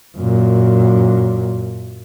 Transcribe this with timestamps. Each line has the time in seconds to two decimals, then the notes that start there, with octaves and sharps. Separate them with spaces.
0.17 F#2 A#2